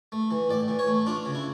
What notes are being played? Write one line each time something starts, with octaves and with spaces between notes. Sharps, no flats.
A3
E3
A2 D5
E3
C#5
A3
D4 F4
C#3
E4